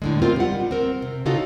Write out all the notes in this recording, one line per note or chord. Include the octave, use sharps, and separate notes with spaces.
A2 D3 G#3
B3 C4 F4 A#4 C5
G3 F#5
C4 A#4
C3
C#3 D#4 F4 F#4 A4